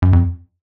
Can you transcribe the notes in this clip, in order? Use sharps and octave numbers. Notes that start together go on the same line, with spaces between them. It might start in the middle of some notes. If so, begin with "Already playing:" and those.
F#2
F2